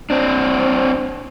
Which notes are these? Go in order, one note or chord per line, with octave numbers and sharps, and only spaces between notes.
C4 D4